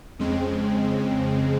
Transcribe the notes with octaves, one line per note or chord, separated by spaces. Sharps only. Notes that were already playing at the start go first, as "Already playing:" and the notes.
F2 C#3 G#3 C4